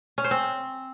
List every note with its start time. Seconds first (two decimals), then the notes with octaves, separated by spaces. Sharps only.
0.18 C#4
0.24 C5
0.31 C4